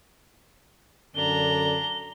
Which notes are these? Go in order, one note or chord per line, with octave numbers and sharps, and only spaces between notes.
F#2 D3 D4 A#5 G7